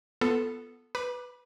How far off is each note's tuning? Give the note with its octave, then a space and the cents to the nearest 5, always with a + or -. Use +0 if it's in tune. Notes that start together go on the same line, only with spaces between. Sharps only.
B3 +0 F4 +0 A4 +0
B4 +0 B5 -35 D6 +15